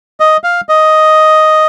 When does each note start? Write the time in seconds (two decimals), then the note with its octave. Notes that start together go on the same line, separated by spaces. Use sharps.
0.20 D#5
0.44 F5
0.69 D#5